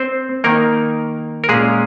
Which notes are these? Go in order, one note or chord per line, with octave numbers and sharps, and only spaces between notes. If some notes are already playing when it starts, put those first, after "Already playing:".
Already playing: C4 C5
D#3 A#3 D#4 A#4
A#4
A#2 G#3 C#4 G#4